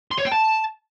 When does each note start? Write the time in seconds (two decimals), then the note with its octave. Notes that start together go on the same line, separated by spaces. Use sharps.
0.11 C6
0.18 C#5
0.25 G5
0.32 A5